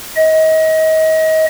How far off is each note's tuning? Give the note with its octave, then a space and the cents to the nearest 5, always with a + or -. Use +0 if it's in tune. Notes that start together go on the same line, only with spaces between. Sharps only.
D#5 +30